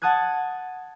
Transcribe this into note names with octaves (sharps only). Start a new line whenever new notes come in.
F#5 A5 D#6 F#6 G#6